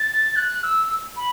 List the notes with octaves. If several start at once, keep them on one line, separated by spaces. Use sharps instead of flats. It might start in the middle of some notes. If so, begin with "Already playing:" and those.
Already playing: A6
F#6
E6
B5